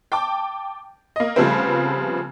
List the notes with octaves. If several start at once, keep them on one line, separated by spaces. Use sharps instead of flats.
G5 A5 D6
A#3 D#5
C#3 F3 G3 A3 B3 C4